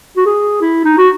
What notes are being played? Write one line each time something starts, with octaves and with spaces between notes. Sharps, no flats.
F#4
G#4
E4
D#4
F#4